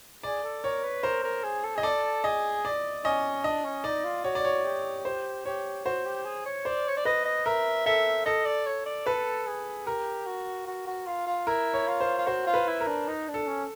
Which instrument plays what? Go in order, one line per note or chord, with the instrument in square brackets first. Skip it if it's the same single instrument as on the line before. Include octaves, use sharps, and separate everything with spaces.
[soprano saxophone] G#4 [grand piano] D5
[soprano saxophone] A4
[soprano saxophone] A#4 [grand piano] C#5
[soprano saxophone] B4
[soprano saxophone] A#4 [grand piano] C5
[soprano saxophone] A#4
G#4
A4
[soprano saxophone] G#4 [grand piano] D#5
[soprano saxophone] A4 [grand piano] D5
[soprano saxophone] G#4 [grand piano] D#5
[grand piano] D5
[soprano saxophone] C#4 [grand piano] D#5
[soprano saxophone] D4 [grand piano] D#5
[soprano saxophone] C#4
[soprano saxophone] D#4 [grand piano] D5
[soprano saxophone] F4
[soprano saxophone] F#4 [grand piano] C#5
[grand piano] D5
C#5
[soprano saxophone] G4
[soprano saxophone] G4 [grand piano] C5
[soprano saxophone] G4 [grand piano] C#5
[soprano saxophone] F#4 [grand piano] C5
[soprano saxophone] G4
G#4
C#5
[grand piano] C5 [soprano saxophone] D5
[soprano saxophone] C#5
D5
[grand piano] B4 [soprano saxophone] D#5
[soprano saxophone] D#5
[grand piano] A#4 [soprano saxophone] E5
[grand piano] A4 [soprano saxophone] E5
[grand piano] A4 [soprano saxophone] D#5
[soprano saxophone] D5
C#5
D5
[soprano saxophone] A4 [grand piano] B4
[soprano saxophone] G#4
[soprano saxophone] G4 [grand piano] A#4
[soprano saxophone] F#4
F#4
F#4
F4
F4
[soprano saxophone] E4 [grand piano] A#4
[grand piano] C#5
[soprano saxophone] F4
[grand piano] C5
[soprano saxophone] F4
[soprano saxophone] F#4 [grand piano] C5
[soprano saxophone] F4
[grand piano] B4
[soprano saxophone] E4
[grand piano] A#4
[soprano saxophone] D4
D#4
D4
[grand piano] A4
[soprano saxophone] C#4